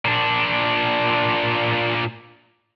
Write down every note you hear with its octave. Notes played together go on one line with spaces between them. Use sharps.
A#2 D4